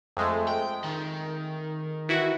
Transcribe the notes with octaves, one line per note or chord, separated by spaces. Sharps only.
F2 G#3 A3
G5
D#3
E3 E4 F#4